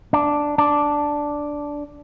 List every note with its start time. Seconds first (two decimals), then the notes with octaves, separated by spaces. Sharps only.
0.13 D4
0.58 D4